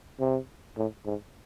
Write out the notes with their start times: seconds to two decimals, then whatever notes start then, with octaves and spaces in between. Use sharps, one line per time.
0.20 C3
0.77 A2
1.06 G#2